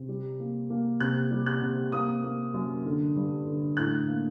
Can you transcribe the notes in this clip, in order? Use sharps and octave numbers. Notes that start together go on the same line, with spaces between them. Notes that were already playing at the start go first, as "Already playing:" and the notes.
Already playing: C3
G3
A#3
A#3
C3 F#6
G3
F#6
C3
A#3 D#6
A#3
F#2
D3
G2
D3
A2 F#6
A#3